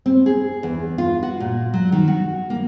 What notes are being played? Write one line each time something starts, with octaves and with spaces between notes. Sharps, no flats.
C4
G#4
E2
F4
F#4
A#2
F#3
D#3
F#4
A#3